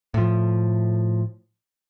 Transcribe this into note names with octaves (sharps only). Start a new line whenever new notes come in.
A2 F3